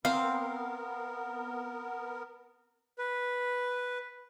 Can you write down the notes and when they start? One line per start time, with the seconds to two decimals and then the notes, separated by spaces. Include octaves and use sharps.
0.05 B3 C4 A#4 F5
2.98 B4